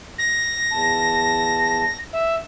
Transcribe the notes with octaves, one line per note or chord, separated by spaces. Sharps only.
A#6
E2 A5
E5